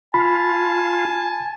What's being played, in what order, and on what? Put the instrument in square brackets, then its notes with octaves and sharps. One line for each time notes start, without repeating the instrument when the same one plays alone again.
[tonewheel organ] F4 [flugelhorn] G#5 [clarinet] A5 [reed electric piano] B5